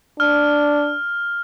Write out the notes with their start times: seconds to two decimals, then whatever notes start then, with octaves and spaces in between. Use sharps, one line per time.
0.20 D4 F6